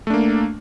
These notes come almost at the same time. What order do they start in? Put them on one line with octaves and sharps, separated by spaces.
A3 D4 A#3